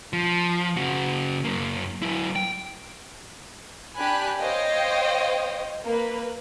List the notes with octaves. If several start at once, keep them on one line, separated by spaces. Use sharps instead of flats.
F3
C#3 F#4
F#2 A#3
F#3 E4
G5
D4 G4 G#5 B5 F#6
C5 C#5 D#5 F5 G5
A#3 B4